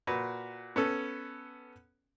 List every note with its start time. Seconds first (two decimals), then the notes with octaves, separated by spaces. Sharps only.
0.07 A#2 F#4 B4
0.76 B3 C#4 A4